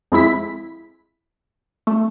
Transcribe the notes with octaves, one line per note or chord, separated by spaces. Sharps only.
F2 G#3 E4 B6
A3